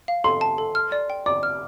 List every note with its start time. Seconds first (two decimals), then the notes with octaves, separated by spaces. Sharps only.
0.08 F5
0.24 A4 C6
0.41 A5
0.58 A4
0.75 F6
0.92 D5
1.10 G5
1.26 D5 D6
1.43 F6